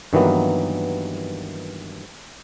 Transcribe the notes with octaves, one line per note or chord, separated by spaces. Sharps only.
G2 D#3 E3 F#3 A#3 B3